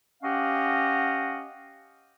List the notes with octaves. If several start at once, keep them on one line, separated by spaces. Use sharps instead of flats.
C#4 G4 D#5 F5 F#5